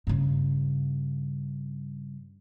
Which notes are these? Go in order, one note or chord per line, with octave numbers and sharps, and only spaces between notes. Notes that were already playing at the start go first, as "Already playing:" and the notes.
G2 C#3